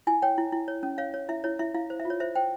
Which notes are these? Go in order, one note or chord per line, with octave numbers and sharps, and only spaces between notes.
E4 G#5
C#5 G5
E4
E4
C#5
C#4
C#5 F5
C#5
E4 E5
E4 C#5
E4 E5
E4 F5
C5
E5
F4
C#5
C5 E5
C5 G5